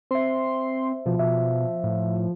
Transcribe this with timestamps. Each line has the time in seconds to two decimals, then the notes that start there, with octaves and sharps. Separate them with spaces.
0.11 C4 C5 E5 C6
1.06 B2 F3
1.19 B2 E5
1.84 A2